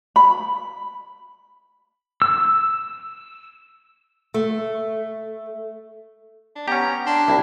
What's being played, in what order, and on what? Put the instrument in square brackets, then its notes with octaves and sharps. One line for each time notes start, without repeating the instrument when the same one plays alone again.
[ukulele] B5
[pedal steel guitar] E6
[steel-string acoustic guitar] A3
[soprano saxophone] D4
[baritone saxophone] B3 [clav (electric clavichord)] C#4 G4 [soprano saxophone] A#5
[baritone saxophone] D4 [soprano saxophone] C6
[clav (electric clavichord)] C2 [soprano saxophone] E4